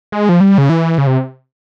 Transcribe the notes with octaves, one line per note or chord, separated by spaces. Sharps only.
G#3
F3
G3
C#3
E3
C#3
C3